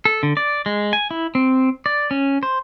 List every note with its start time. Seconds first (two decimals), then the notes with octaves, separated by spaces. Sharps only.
0.05 A4
0.23 D3
0.37 D5
0.66 G#3
0.93 G#5
1.11 E4
1.35 C4
1.86 D5
2.11 C#4
2.43 C5